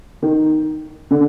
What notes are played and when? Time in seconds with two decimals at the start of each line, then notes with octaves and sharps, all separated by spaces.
0.22 D#3
1.11 D3